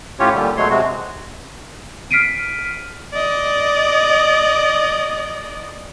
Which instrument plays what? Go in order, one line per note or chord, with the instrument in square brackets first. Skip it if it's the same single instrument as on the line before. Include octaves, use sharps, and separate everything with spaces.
[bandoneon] A2 C#4 F4 G4 C#5
A#2 D3 G3
B2 F#3 G#3 A3 C#5 C6
C3 G#3 F#4
[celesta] F6 B6 C7 D7 D#7
[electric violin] D5 D#5